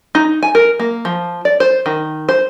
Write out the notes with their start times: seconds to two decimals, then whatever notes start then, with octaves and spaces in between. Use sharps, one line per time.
0.15 D#4
0.43 G#5
0.55 A#4
0.80 A#3
1.05 F3
1.45 D5
1.60 C5
1.86 D#3
2.29 C5